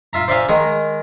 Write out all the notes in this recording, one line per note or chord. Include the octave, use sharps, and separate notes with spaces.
F4 E5 A#5
C5 D5 E5 F5 G#5 A#5
D#3 G#3 A#5